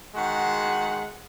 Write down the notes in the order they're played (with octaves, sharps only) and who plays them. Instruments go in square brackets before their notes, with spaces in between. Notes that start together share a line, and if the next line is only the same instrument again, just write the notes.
[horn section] D#3 G#3 F#4 F#5